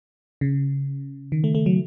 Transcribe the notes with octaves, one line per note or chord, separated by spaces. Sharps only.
C#3
D#3
A3
A3
F#3